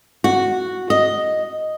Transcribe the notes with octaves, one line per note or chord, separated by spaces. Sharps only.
F#4
D#5